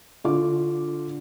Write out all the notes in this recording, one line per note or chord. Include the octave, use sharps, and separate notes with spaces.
D3 F4 D6